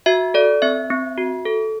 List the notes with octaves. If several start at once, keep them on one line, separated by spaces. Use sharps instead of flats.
F#4 E5
A4 D5
C4 E5
C4
F#4
A4